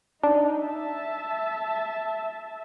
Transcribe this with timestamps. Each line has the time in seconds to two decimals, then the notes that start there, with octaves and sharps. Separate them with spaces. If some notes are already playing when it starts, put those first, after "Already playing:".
0.23 D4 D#4
0.61 E5 A5